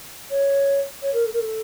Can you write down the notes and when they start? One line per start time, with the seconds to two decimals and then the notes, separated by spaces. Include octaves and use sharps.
0.30 C#5
1.02 C#5
1.14 A#4
1.25 A4
1.33 A#4
1.40 A4